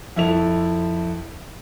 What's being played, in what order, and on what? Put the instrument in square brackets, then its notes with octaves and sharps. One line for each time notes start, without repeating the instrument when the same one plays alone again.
[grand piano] F2 E4 A4 F7